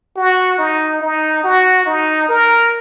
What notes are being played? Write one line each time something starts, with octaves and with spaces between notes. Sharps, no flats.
F#4
D#4
D#4
F#4
D#4
A#4